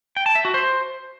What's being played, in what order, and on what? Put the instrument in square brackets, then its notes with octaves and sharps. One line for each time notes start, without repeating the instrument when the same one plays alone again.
[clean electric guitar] G5
A5
E5
F#4
C5